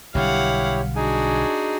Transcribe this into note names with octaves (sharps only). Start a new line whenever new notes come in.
B1 D3 G3 E4 G4 C#5 F5 F#5
D4 D#4 F#4 G#4 G#5